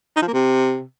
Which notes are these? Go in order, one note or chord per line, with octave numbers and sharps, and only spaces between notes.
D#4
F3
A#3
C3